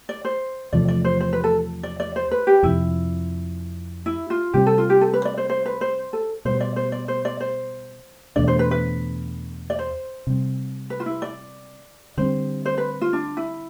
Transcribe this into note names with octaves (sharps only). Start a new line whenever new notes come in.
D5
C5
E2 C3 F3 A3 D5
D5
C5
C5
B4
A4
D5
D5
C5
B4
G4
F2 C3 F3 E4
E4
F4
C3 G3 C4 G4
A4
F4
G4
A4
B4
D5
C5
C5
B4
C5
A4
B2 G3 B3 C5
D5
C5
D5
C5
D5
C5
E2 B2 A3 D4 D5
C5
B4
B4
D5
C5
C3 G3 C4
B4
F4
E4
D5
D3 G3 C4 C5
C5
B4
F4
D4
E4